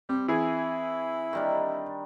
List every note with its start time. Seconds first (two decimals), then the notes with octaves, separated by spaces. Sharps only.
0.09 G3 C4
0.28 E3 E4 G#4
1.33 D#3 G3 D4